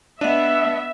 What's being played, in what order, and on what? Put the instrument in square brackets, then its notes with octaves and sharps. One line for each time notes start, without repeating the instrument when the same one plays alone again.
[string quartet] B3 [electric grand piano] D4 [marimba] D#5 F#5 [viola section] E5